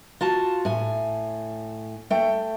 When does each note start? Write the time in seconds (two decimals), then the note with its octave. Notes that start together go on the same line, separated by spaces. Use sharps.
0.21 F4 F#4 A5
0.65 A2 G#5
2.10 A3 G5